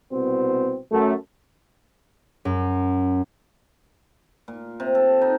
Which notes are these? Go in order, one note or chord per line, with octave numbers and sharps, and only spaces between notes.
C2 B2 C4
F#2 A3
F#2
A#2
C3
A4
D#4